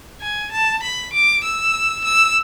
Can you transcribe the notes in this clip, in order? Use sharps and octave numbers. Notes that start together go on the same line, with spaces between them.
G#5
A5
B5
D6
E6
E6